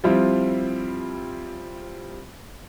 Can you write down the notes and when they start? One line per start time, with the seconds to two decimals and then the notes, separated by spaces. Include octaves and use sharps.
0.04 F3 G3 C4 E4 F4